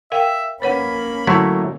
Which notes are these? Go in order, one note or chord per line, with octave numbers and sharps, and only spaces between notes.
A#4 E5 F5 G5
A#3 C#4 B4 C#5 F#5 B5
D3 F#3 A3 E4